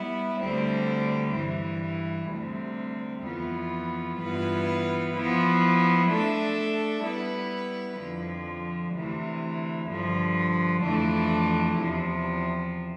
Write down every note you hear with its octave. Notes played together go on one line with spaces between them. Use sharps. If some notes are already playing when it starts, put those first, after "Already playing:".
Already playing: G3 B3 E4
D2 D3 G3 C4
G2 E3 G3
D2 C3 G3 C4
F2 E3 B3 F4
G2 E3 B3 F4 B4
F3 B3 E4
A3 D4 A4 E5
G3 B3 E4 B4
F2 D3 F3
D2 C3 E3
G2 D3 F3
F2 E3 A3 D4
E2 C3 F3